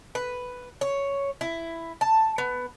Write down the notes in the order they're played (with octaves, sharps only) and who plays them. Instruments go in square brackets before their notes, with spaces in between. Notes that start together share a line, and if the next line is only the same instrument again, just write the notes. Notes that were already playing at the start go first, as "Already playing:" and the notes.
[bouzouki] B4
C#5
E4
A5
B3